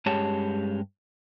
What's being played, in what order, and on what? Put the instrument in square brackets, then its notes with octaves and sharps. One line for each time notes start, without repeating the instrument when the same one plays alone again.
[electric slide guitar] G2 G#3 C#4 G4 C#5 A5